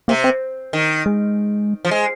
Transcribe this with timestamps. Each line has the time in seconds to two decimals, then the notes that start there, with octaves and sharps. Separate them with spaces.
0.08 C3 A#3
0.24 C4
0.73 D#3
1.06 G#3
1.85 F3
1.91 G#3